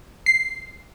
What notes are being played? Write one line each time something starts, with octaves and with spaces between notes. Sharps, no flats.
C7